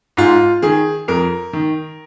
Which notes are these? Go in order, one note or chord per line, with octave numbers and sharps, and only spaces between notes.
G#2 F4
D#3 G#4
F2 A#4
D#3